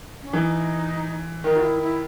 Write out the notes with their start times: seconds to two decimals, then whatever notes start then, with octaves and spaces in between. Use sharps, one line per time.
0.22 C#4
0.33 E3 D#4
1.44 D#3 D#4
1.56 F#4
1.62 E4
1.81 E4